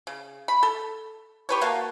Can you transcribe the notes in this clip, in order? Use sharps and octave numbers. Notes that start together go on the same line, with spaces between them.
C#3
B5
A4
G4 B4 C#5
A#3 F#4 F5 A5